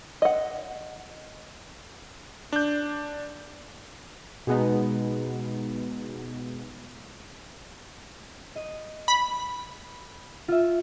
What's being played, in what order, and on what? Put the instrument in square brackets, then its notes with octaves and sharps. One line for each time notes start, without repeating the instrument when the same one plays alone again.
[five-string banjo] D#5 F#5
[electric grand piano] D4 G6
[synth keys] B2 G#3 B3 D#4
[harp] D#5 D#7
[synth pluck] B5
[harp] F4 E5